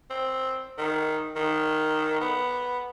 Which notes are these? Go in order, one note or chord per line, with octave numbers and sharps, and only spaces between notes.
C4
D#3
D#3
B3